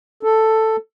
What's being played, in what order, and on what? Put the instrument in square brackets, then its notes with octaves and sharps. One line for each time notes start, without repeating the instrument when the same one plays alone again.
[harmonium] A4